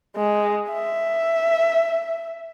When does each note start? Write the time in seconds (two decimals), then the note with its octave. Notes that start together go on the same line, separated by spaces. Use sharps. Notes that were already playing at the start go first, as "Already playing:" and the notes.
0.16 G#3
0.71 E5